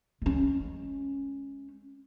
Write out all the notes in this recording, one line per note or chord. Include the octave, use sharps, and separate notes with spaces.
G#3 C#4